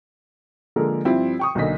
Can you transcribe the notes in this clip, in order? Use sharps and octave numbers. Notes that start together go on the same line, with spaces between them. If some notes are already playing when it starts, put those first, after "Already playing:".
D3 F3 G#3 A#3 A4 A#4
G2 F3 C4 E4 F4
G5 C#6 D#6
B1 D3 A#3 D#5 B6